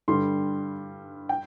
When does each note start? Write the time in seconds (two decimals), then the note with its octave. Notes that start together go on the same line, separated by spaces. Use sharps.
0.08 G2 D3 G3 C6
1.29 G5